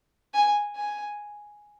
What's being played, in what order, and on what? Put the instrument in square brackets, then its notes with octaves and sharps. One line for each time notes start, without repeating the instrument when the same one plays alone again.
[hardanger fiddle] G#5
G#5